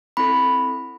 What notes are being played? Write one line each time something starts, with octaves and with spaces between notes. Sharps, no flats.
C4 E4 A4 B5